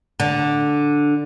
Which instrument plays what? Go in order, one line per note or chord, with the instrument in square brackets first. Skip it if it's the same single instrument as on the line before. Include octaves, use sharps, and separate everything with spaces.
[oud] D3